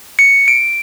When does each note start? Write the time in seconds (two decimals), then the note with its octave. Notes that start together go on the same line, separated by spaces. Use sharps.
0.19 C#7
0.48 D7